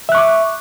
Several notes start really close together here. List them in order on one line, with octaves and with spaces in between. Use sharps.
E5 F#6 C#6 D6